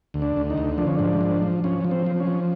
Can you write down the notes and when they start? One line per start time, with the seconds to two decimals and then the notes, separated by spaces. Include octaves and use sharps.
0.14 D2
0.22 D4
0.36 D2
0.50 D#4
0.58 D2
0.78 F3 D4
0.87 C#4
0.95 G#2 D4
1.21 F3
1.42 F3
1.64 F3 C#4
1.84 F3
1.91 C4
2.06 F3
2.20 C#4
2.27 F3